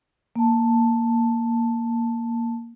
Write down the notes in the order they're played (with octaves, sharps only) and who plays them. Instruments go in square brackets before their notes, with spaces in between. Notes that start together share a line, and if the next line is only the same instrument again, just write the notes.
[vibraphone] A#3 A5